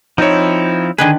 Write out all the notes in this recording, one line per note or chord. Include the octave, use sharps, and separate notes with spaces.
F3 C4 D#4 E4 C#5
D3 D#3 G#4 B4